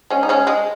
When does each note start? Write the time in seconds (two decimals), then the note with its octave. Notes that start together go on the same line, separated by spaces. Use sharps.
0.10 G#3 C#4
0.23 D#4
0.29 G#3 C#4
0.47 G#3